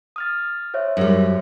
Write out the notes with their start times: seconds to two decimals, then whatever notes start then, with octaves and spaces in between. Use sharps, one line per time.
0.16 D#6 F6 A6
0.74 C5 C#5 E5
0.97 F#2 G3